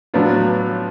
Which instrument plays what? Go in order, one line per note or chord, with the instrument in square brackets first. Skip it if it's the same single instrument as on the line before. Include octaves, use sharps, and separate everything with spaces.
[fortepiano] A2 F#3 B3 D4 F4